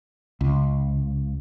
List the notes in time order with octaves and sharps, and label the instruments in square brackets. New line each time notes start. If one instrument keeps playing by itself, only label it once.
[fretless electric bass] C#2